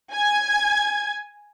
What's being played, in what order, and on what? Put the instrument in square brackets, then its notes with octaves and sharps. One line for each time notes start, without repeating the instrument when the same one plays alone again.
[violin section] G#5 G#6